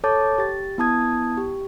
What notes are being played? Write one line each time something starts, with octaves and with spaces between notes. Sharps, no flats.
A4 C#5 A5 D6 G6 A6
G4 A6
B3 E4 A5 D#6 G#6
G4